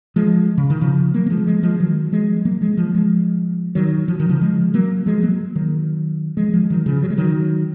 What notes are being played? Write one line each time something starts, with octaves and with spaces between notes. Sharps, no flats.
F3 G#3
C#3
D#3
C#3 F3
F#3 A#3
A#3
F3 G#3
F3 G#3
F3 G#3
D#3 F#3
F3 G#3
G#3
F#3 A#3
F3 G#3
F3 G#3
F3 G#3
D#3 F#3
F3
D#3
C#3 F3
F3 G#3
F#3 A#3
F3 G#3
F#3 A#3
D#3 F#3
F3 G#3
F3 G#3
D#3 F#3
C#3 F3
F#3
G#3
D#3 F#3